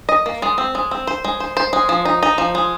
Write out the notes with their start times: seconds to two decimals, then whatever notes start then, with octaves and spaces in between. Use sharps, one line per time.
0.09 D#5
0.26 A#3
0.42 G#3
0.58 C4
0.75 G#3
0.91 C4
1.07 C5
1.24 G#3
1.40 C5
1.57 C5
1.73 G#3
1.89 F3
2.05 D#4
2.23 D#4
2.38 F3
2.55 G#3